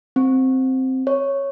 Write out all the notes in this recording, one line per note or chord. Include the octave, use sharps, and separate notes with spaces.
C4
C#5